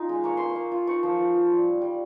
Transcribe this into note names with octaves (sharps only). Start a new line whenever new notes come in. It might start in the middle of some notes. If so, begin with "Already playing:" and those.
Already playing: C#4 D#4 F4
G#3
A#3 C#6
A#3 C6
C#6
A#3
F4
D#4 C#6
F3
F3
F3
G3
G3
G3